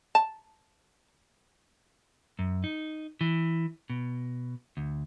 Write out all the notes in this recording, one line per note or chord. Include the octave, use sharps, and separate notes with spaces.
A5
F#2
D#4
E3
B2
D2